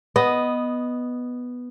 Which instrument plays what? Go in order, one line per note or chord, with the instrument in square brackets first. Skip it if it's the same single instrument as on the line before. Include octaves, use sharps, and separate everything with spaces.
[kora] B3 D#5